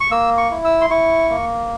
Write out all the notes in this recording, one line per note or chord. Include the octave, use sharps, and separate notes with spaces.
C#6
A#3 E6
C#6
E4
E6
C6
E4 C#6
A#3